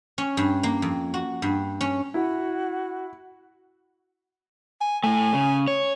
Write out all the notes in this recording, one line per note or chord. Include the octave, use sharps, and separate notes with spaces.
C#4
G2
A#3
F2
F#4
G2
C#4
E4 F#4
G#5
A2 A3 G#5
C#3
C#5